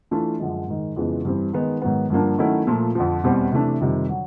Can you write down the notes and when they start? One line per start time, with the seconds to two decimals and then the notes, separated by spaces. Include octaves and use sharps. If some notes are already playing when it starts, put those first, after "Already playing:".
0.11 E3 A3 D4 F4
0.39 F#2 D3 F3 G#3
0.68 G#2 D#3 G#3
0.96 F2 C#3 E3 G#3 B3
1.25 G2 E3 G3 C4
1.53 D#3 G#3 B3 D#4
1.82 G#2 D#3 F#3 B3
2.10 G2 D3 F3 A#3 D4
2.38 D#3 F#3 A3 C#4 E4
2.67 A#2 F3 A3
2.95 F2 D3 F3
3.24 E2 B2 G3 C4
3.52 C3 E3 A3 D4
3.80 F2 C3 D#3 G3
4.09 D3 F#3